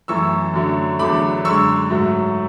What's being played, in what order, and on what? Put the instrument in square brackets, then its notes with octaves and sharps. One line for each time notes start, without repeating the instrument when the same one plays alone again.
[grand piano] F#2 E3 A3 C#6 E6
F#2 D3 F#3 A3
E2 D3 F#3 A3 B5 D6
F#2 D3 G#3 C#6 E6
G#2 F#3 A3